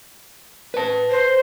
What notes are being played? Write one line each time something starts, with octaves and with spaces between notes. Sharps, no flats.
B4 A5
C5